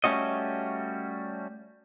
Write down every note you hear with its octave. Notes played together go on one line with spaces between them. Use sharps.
G3 A3 C#4 F#4 D#5